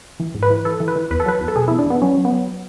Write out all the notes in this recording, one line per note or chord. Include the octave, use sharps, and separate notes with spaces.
E3
G#2
B4
E3
E3 A4
E3
B4
E3
E2 B4
A4
F#3 B4
E2
A4
B2 G#4
E4
E2
D4
E2 B3
F#3 C#4
F#3
B3
F#3